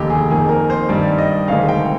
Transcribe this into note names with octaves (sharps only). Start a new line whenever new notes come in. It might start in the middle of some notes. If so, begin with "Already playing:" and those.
Already playing: F1 D#2 D3 G4 D#5
G#4
F2 D#3 A#3 G#4
A#4
C5
G2 D#3 G3 D5
D#5
D2 C3 D#3 G#3 F5
G5